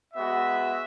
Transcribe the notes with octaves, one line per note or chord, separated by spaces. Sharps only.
G#3 B3 F#4 E5